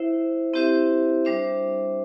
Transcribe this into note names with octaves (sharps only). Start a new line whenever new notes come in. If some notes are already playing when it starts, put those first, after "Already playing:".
Already playing: E4 C5 E5
C4 E4 G4 C5 E5
G3 D4 C5 E5